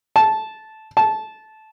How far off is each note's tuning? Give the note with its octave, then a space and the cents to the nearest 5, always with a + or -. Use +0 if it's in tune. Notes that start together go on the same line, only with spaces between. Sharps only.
A5 -10
A5 -15